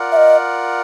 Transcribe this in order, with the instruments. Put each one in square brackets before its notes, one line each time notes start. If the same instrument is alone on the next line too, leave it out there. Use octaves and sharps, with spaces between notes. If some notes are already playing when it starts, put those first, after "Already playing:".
Already playing: [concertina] F4 A#4 D5 F#5
[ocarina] E5
D#5